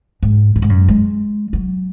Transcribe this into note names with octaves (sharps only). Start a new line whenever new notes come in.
G#2
F#2
G#2
F#2
G#3
F#3